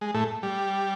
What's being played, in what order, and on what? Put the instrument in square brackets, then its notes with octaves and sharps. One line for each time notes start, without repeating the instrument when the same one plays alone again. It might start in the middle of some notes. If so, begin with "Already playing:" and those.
[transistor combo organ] G#3
A2 A3
G3